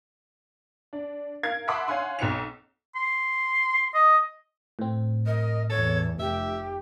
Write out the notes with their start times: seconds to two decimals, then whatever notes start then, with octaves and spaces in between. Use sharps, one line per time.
0.93 D4
1.43 A#4 F5 G#6
1.68 E5 F#5 A5 B5 C6 D6
1.88 C#5 F5 F#5 G#5 C6
2.19 B1 F#3 C4 C#7 F7
2.95 C6
3.94 D#5
4.79 A2 C4
5.26 A#4 D#5
5.70 E2 A4 C#5
6.20 F1 G4 E5